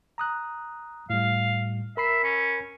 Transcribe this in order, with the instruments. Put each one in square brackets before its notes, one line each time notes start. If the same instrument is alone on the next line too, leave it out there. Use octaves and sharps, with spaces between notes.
[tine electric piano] A#5 D#6 F#6
[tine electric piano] A2 G3 [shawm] F5
[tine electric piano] A#4 B5 C7 [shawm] E5
[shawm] C#4